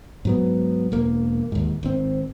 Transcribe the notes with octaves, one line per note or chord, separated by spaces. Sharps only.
G#2 F#3 B3
E1 A#3
D#2 G#2
G#1 C4